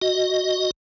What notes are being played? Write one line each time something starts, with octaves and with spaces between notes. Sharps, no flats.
F#4 D#5